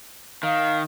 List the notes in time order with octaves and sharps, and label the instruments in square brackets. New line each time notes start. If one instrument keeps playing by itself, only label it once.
[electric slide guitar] D#3 [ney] F5